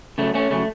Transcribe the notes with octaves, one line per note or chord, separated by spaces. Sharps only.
C#3 F#3 A3
A3 C#4
C#3 F#3 A3